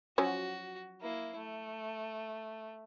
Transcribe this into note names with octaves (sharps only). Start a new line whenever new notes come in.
F3 F#3 C#4 F#4
A#3 E4
A3